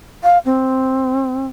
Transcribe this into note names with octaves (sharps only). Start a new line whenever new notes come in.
F5
C4